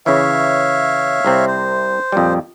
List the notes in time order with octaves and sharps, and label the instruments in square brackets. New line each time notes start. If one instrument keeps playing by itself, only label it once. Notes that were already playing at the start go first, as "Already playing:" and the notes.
[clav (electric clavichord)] C#3 E3 [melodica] C#5 E5 F5
[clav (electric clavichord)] C2 C3 C4
[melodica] C5
[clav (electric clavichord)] F2 A#2 G3